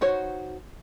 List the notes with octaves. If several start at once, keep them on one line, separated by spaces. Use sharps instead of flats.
D#4 F#4 C5 C#5